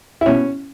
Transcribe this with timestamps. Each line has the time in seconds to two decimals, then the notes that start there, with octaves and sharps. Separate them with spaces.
0.21 E4
0.26 B2 C#4